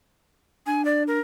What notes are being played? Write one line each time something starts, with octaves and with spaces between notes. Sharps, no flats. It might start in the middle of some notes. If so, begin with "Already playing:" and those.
D4 G#5
D5
A#4